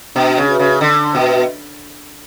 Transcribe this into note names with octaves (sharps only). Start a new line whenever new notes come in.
B2 D4
C#3
F#4 B4 E5
C#3
D3 D4
B2 F#4 B4 E5